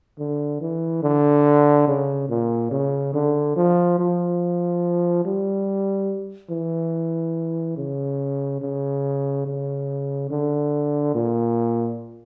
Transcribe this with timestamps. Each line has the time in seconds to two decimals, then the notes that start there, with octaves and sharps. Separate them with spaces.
0.19 D3
0.61 E3
1.03 D3
1.88 C#3
2.29 A#2
2.71 C#3
3.14 D3
3.56 F3
3.98 F3
5.25 G3
6.50 E3
7.77 C#3
8.61 C#3
9.46 C#3
10.30 D3
11.14 A#2